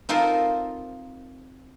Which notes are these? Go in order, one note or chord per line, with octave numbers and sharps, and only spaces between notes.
C4 D#4 F4 A4 A#4 C5